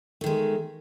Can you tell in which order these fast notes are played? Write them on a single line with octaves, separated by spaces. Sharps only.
A3 D#3 G#3